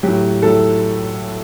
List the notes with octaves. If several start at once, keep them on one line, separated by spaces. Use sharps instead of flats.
A2 F#3 G4
A2 F#3 A4